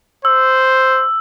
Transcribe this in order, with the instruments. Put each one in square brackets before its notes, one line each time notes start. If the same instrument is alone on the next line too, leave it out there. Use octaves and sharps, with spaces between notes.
[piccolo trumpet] C5 [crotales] E6